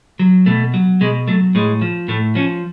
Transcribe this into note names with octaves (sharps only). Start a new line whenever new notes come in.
F#3
B2 A3
F#3
B2 G#3
F#3 A3
A2 G#3
F3
A2 A3
F3 C#4